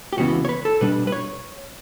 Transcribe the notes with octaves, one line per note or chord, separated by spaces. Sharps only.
G4
C#2 C#3 E3 B3 F#4
C#5
B4
A4
B2 G3 D4 B4
B4
C#5